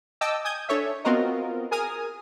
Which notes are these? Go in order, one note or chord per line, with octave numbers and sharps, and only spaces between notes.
D#5 G5 A5 D6 E6
G#5 D#6 G6 G#6
D4 A4 C#5 E5
B3 C4 F4 F#4 A#4 D#5
G#4 A#4 G#5 D#6 F6